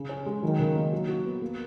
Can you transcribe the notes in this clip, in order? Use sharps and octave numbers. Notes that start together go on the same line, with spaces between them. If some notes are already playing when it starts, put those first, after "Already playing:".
Already playing: C#3
C#4
G#3
D#3 F#3
C#3
A#3
F#3
F#4
B3
A#3